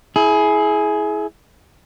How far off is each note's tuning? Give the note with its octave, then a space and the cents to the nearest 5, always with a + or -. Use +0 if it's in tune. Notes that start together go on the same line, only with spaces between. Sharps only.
E4 -10 G#4 +20